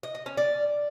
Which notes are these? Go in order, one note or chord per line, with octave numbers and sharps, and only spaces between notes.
D#5
D#5
C#4
D5